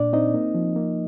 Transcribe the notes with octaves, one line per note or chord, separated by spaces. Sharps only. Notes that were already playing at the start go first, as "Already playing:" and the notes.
Already playing: A#2 D4 D5
C4 D#4 D#5
A#3
F3
A#3